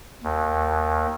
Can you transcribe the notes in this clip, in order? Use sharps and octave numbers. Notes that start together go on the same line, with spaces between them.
D#2